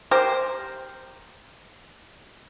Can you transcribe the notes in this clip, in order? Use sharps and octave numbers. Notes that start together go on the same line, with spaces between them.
G4 A#4 C5